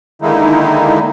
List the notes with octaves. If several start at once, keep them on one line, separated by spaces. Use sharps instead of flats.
D3 D#3 G#3 A#3 D#4 E4